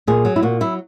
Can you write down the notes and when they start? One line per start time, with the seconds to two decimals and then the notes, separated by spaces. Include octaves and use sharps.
0.07 A#2 G#4
0.25 F#3
0.36 E4
0.43 A#2 F#4
0.61 F#3 E4